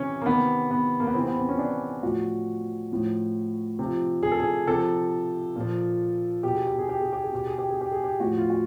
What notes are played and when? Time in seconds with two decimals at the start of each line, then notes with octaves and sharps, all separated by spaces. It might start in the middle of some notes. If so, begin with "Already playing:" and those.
Already playing: C3 E3 C#4
0.22 A#3
0.26 C3 D#3 B3
0.71 B3
1.00 A#3
1.07 B3
1.14 C3 E3 C4
1.27 B3
1.38 C4
1.49 C#4
1.59 D4
2.02 A2 F3 F#4
2.91 A2 F3
3.79 C3 F3
4.23 G#4
4.32 A4
4.40 G#4
4.67 C3 F3 A4
5.56 A#2 F3
6.43 B2 G4
6.55 G#4
6.67 G4
6.79 G#4
6.89 G4
7.01 G#4
7.13 G4
7.23 G#4
7.32 B2 G4
7.47 G#4
7.58 G4
7.70 G#4
7.81 G4
7.92 G#4
8.04 G4
8.20 A2 F3 F#4
8.38 F4
8.50 F#4